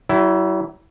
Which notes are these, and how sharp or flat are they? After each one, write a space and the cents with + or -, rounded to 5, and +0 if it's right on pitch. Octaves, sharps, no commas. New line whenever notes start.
F#3 +40 E4 +0